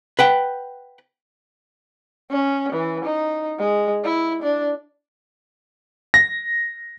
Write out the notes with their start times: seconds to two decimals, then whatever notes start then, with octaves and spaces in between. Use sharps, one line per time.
0.19 B4 F#5 G5
2.31 C#4
2.73 E3
3.05 D#4
3.59 G#3
4.04 E4
4.43 D4
6.14 A#6